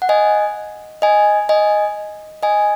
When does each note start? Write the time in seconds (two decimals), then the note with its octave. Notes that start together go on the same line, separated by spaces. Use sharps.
0.02 F#5
0.09 D#5 G#5
1.02 D#5 G#5
1.49 D#5 G#5
2.43 D#5 G#5